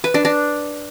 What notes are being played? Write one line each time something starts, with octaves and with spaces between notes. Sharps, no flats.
B4
D4
D4